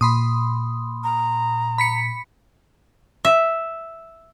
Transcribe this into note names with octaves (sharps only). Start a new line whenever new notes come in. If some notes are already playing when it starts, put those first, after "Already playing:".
A#2 B5 C6 D#6
A#5
B5 B6 C#7
E5